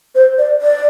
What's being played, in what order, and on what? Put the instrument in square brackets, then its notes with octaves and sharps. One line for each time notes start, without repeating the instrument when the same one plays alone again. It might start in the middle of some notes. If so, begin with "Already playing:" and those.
[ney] C5
D5
D5